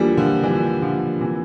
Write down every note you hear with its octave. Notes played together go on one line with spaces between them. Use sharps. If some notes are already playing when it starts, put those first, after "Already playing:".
Already playing: E3 F3 G3 A3 A#3 D4 F4 A#4
D3 F3
E3 G3
D3 F3
C3 E3